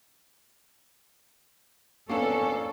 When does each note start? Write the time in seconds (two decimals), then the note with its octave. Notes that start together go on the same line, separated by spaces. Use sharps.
2.09 F2 A#3 B3 C#4 D4 A4 C#6